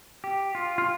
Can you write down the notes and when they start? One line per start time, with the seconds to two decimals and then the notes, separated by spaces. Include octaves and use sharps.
0.24 G4
0.55 F4
0.78 F4